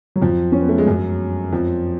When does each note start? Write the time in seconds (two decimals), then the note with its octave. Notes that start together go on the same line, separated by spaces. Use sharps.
0.16 F#3
0.22 F2 F3
0.52 C#4
0.61 B3
0.69 A3
0.78 G#3
0.87 F#2 F#3
1.53 F2 F3